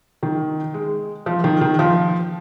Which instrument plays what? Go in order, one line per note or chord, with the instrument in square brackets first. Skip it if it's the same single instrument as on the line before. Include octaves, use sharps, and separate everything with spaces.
[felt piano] D#3
G#3
F3
D#3
D#3
F3